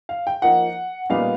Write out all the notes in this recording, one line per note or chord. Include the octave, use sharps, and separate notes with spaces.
F5
G5
F3 A#3 D#4 F#5
A#2 G3 B3 D#4 F5